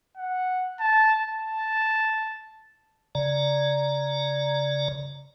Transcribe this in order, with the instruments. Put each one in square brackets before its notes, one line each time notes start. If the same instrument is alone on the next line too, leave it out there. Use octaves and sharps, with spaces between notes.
[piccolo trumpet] F#5
A5
A5
[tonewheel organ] C#3 D5 A#5